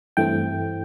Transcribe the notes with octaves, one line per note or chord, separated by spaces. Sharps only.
G2 E3 A3 C4 G5